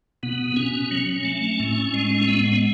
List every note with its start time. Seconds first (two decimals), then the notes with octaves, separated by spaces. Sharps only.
0.23 B2 B3
0.56 B2 C#4
0.91 F#3
1.25 A3
1.60 A2
1.94 G#3
2.22 C#4
2.28 G#3 B3